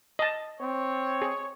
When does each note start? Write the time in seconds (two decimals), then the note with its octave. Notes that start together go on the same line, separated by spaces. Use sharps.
0.19 D#5 A5
0.61 C4 C#5
1.22 G#4